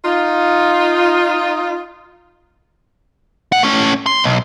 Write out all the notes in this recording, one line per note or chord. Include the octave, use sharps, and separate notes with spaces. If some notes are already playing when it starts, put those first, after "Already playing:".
D#4 F4
G#2 F#5
A3 C#4
C6
B1